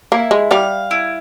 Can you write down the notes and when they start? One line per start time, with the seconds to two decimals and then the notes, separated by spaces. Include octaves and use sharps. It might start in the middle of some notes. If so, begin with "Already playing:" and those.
0.12 A#3 E4
0.31 G#3
0.51 G3 F5
0.91 E4